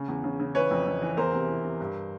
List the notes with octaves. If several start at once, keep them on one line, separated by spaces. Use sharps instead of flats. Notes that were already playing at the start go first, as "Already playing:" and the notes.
Already playing: C#3
E2
C#3
C#3
E3 B4 C#5
F2
F2
E3
E2 A#4 C5
C3
E3
C3
G2